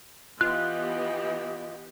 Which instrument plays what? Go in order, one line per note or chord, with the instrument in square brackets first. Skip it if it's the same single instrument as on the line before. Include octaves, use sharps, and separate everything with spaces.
[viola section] E3 B3 G4 [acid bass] F4 [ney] D#5 [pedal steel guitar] F#6